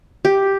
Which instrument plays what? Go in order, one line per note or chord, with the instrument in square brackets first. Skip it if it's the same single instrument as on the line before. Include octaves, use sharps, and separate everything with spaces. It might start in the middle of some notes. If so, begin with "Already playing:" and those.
[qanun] G4